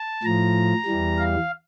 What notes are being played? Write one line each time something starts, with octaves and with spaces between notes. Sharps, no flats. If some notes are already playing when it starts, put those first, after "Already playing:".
Already playing: A5
A2 F3 A#5
E2 E3 G3
F5